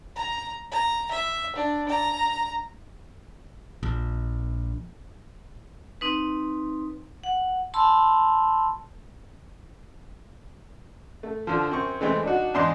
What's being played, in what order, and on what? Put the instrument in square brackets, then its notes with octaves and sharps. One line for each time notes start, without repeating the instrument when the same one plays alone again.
[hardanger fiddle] A#5
A#5
E5
D4
A#5
[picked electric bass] A#1
[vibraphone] C4 D#4 B4
F#5
A5 B5 C6 E6
[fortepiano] A3
D3 F3
F#2 C4 C#6
E3 G#3 A3 C4
D4 D#4 F#4
E2 G#2 D4 D#5 C6